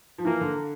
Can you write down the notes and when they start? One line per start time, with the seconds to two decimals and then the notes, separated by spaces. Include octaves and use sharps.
0.18 F3
0.25 E3 A#3
0.41 D3